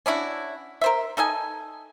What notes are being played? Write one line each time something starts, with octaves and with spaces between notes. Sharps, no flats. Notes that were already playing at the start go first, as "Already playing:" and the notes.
C#4 D4 E4 F#4
A#4 C5 E5
D#4 A4 D#5 G#5